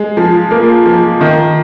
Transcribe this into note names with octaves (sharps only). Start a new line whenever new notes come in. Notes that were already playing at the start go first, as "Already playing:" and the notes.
Already playing: G#3
F3
A#3
F3
D#3